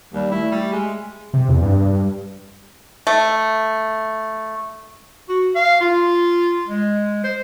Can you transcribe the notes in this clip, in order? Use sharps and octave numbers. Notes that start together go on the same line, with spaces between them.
D#2 G3
A3 E4
G3
G#3
C3
E2
G2
A3
F#4
F5
F4
G#3
C5